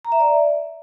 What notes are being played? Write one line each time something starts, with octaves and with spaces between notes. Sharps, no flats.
A#5
E5
D5